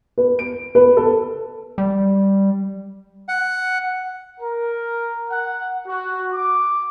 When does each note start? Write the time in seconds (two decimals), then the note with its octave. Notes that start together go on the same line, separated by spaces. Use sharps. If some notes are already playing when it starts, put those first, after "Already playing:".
0.18 B4
0.39 D7
0.75 B4
0.97 A4
1.78 G3
3.28 F#5
4.40 A#4
5.29 F#5
5.87 F#4
6.32 D6